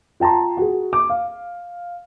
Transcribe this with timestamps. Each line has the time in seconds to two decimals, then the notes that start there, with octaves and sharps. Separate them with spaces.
0.20 F4 G5 A5 A#5 C6
0.57 F#4 G#4
0.93 D6
1.10 F5